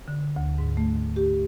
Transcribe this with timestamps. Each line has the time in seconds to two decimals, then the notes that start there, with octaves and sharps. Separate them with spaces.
0.08 D3
0.36 D2
0.58 G#2
0.77 A3
1.16 G4